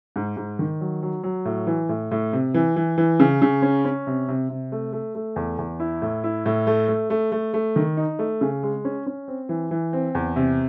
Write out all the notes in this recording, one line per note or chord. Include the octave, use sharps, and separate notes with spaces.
G#2
G#2
D#3
F#3
F#3
F#3
A2
E3
A2
A2
C3
E3
E3
E3
C#3
C#3
C#4
C#4
C3
C3
C3
A3
A3
A3
E2
E2
E4
A2
E4
A2
A3
A3
A3
A3
A3
D#3
D#4
A3
C#3
G#3
C#4
C#4
C4
E3
E3
C4
E2
C3